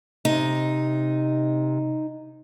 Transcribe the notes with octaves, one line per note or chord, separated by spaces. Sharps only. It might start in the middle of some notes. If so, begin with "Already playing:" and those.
C3 D#4